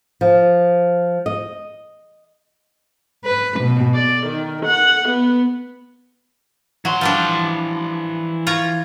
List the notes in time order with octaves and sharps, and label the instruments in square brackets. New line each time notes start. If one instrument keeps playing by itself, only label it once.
[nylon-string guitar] F3
D#5
[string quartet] B4
B2
D5
D#3
F#5
B3
[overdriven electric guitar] E3 C6 [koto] F#3
[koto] F3 G3 D4
F4 C#5 A#5